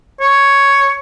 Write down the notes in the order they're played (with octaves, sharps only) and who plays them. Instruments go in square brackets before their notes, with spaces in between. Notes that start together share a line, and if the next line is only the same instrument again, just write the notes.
[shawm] C#5